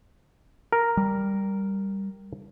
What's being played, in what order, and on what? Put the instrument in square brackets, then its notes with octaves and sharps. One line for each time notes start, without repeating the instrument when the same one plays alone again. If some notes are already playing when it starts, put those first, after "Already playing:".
[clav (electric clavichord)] A#4
[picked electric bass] G3